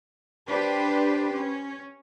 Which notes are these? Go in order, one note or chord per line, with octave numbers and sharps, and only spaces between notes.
D4 G4 B4 C5
C#4